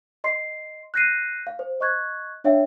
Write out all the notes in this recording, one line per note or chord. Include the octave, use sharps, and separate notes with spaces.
D#5 C6 C7
F#6 G6 A#6 C7 D#7
F5
C5
D#5 C#6 F#6 G#6
D4 C#5 E5 F5 G5